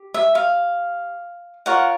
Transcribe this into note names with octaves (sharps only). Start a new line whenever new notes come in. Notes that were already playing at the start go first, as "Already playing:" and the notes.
Already playing: G4
E5
F5
F4 A#4 C#5 F#5